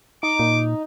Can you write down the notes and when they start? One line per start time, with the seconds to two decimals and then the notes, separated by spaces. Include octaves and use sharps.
0.23 D#4 D6
0.39 A#2